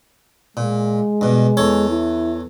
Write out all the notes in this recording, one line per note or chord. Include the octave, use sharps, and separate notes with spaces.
A#2 G#3
G2 B2
E2 A4 C#5
E4